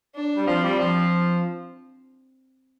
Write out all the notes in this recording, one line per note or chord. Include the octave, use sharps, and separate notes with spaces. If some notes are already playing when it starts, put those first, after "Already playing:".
D4
G3
F3 C4
G3
F3